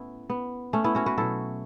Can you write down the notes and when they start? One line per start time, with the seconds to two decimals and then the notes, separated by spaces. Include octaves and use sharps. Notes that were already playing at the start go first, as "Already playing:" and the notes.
Already playing: A2 B3 C#4 E4
0.30 B3
0.73 A3 C#4
0.84 B3 E4
0.95 C#4 F#4
1.06 F#4 B4
1.17 B2 F#3 E4 A4